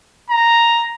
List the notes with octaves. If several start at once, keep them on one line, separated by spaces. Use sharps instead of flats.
A#5